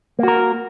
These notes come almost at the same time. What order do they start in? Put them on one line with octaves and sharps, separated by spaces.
A#3 F#4 A#4